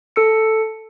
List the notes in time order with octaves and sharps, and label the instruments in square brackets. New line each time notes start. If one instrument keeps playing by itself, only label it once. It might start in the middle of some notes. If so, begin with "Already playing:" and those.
[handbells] A4 E6 C#7